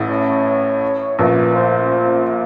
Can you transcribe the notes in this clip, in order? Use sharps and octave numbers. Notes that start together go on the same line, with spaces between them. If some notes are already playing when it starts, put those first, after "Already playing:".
Already playing: A1 A2
C#5
A#1 A#2 B4
C5